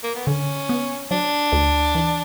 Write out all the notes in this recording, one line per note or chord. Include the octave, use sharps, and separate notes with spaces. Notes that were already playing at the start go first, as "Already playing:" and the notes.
A#3
B3
D3 C#4
B3
F#3 D4
D2
E3